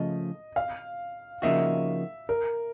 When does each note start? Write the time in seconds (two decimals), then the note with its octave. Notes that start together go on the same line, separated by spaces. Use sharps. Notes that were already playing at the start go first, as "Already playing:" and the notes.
Already playing: C#3 F3 A3 D#5
0.56 F5
1.42 C#3 F3 A#3 D#4 F#4 E5
2.29 A#4